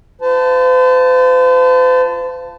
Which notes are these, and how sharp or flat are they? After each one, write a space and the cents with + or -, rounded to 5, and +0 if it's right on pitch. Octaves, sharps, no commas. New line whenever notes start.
F4 -10 C5 -45 A5 +0